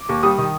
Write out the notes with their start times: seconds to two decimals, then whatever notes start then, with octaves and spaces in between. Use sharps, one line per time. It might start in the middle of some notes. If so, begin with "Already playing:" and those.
Already playing: D6
0.09 D#2
0.23 G3 D#6
0.38 D#3